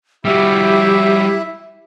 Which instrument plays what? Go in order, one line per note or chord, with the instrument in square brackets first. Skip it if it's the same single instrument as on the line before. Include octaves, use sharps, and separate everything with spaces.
[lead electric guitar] G3 F#4 [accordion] E4 E5 [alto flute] G4